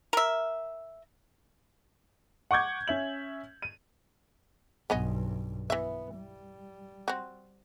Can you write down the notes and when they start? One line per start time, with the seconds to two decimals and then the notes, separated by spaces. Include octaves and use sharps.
0.13 A#4 E5
2.51 F#5 C#6 D6 G6 G#6
2.88 C#4 E5 F#7
3.62 D#7
4.90 B1 G2 B3 C#4 D#5
5.70 E3 B3 E5
6.16 G3
7.08 C4 F#4